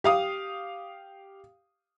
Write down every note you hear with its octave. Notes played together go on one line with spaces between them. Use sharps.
G4 F5 D#6